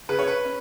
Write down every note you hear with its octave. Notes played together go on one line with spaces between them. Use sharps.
C#3 B4
C#5
B4
C#4